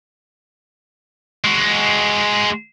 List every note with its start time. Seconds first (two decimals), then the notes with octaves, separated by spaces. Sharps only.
1.44 G#3 F#4